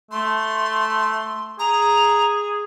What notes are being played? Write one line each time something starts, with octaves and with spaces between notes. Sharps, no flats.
A3 C6
G#4 A#5